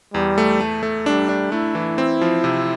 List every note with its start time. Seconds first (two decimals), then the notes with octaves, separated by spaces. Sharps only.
0.14 E2 G3
0.38 A3
0.61 A3
0.83 A3
1.06 G3 D4
1.29 D4
1.51 A3 E4
1.75 E3
1.98 C4
2.21 F3
2.44 C3